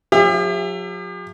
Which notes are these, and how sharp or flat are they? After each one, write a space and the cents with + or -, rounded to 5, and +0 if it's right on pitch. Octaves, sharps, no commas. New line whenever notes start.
F#3 -40 G4 +45 E5 +20